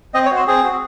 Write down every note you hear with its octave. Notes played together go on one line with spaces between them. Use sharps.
C4 D#5
C#5
F#4
C5
C4 G#4
F#4